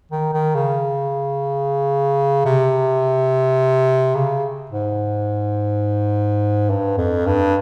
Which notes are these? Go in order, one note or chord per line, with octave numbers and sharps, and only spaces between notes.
D#3
D#3
C#3
C3
C#3
G#2
G2
F2
G2